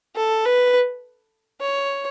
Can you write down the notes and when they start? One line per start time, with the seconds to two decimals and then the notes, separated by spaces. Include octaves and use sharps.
0.16 A4
0.45 B4
1.61 C#5